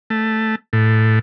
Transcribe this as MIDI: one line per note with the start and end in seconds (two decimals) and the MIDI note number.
0.10 0.55 57
0.73 1.19 45